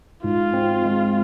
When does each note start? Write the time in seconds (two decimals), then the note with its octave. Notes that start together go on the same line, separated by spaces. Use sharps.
0.24 G#2 F4
0.54 C4
0.84 G#3